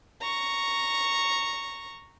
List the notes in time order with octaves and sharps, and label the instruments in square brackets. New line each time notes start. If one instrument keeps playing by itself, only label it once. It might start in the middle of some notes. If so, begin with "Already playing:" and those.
[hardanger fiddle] A#5 C#6